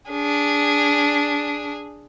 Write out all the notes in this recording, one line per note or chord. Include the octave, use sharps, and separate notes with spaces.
D4 G#4